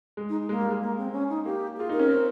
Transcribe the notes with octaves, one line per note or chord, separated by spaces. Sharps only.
G#3
D#4
G#3 A#3
G3
G#3
A#3
C4
C#4
D#4
A#3 G4
F4 G#4
D#4 A#4
C#4
C4